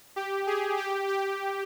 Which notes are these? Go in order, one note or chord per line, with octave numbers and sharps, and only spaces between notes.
G4
G#4
G4
G4